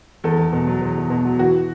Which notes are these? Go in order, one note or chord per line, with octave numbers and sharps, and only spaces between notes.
E2 A4
E2
B2
F#3
E2
E2
B2
F#3
E3 F#4